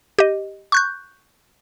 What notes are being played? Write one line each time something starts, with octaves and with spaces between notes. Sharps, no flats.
G4 D#5
C#6 F#6 G6